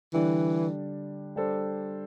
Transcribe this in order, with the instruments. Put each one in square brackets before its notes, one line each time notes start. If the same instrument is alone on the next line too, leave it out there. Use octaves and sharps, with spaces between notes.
[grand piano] D3 G3 D4 [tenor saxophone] E3
[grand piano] G3 D4 A4 C5